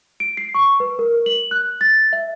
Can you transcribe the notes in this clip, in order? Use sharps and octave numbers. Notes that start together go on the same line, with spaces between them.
D7
C7
C#6
B4
A#4
F#7
F#6
A6
E5